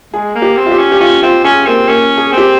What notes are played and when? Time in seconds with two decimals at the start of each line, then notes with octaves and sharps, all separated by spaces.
0.13 G#3 G#4
0.35 A#3
0.42 G4
0.57 C4
0.66 F4
0.72 G4
0.79 C#4
0.92 G4
1.00 C#4 F4
1.23 C4 F4
1.44 C#4 G#4
1.66 A#3 C4
1.88 A#3 C#4
2.18 G#4
2.32 C4
2.38 G4